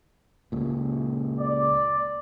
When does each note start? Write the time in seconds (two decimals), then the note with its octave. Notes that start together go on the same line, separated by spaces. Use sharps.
0.52 C#2 A#2
1.39 D5